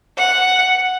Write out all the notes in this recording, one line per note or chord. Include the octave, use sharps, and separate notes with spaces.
F#5